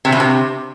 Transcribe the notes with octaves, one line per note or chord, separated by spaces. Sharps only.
C3
B2
C3